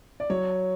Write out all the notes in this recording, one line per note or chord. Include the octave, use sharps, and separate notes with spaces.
D5
F#3 C#5